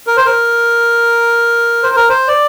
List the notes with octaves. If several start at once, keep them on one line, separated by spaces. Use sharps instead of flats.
A#4
C5
A#4
C5
A#4
C5
D5